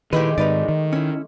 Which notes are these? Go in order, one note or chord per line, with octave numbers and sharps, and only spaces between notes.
A#2 D#3 G#3 A3 E4 G4 B4
G#2 D#3 D#4 B4 D5
D#3
C#4 E4